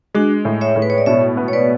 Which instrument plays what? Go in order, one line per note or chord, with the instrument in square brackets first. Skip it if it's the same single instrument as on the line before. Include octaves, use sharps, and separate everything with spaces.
[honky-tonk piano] G#3 [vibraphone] D4 F#4
[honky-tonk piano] A2
[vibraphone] C#5 E5
[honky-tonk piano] A2
[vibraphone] B4
C#5
D5
[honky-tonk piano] B2 [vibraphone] C#5 E5
[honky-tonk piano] B3
[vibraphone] C#5
B4 D5